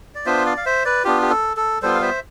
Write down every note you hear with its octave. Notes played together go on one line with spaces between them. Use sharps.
D5
B3 D4 F4 C5 E5
D5 F5
F5
C5 E5
B4 D5
B3 D4 F4 G4
G4
A4
A4
G3 B3 F4 A4 C5
F5
C5 E5